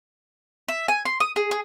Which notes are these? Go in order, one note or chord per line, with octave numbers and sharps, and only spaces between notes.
E5
G#5
C6
D#6
G#4
G#4